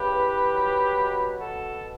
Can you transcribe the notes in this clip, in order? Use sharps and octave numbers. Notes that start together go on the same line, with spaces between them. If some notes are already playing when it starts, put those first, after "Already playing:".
Already playing: C#3 G4 B4
E3
F#3
B2
B2 F#4 A4